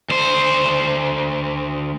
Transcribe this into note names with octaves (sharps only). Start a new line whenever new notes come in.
D2 C5